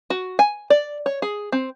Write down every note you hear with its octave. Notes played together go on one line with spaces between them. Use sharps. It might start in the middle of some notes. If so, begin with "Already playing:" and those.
F#4
G#5
D5
C#5
G#4
C4